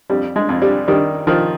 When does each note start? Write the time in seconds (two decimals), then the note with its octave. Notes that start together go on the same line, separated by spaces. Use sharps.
0.10 F2 G3
0.36 G#3
0.49 F2
0.62 G3
0.88 D#3 G3
1.27 D#3 F3